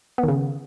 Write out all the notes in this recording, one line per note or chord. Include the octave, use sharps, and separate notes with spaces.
B3
D#3
C#3